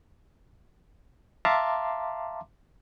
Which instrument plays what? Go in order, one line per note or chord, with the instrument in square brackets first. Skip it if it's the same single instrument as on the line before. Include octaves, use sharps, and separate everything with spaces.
[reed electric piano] E5 F5 A5 A#5 C6 D6